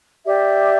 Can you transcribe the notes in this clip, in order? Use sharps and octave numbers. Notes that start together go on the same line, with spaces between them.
G4 D5 E5